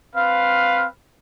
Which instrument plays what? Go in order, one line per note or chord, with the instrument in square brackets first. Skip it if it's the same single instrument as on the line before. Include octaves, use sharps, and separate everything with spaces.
[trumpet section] C4 B4 F5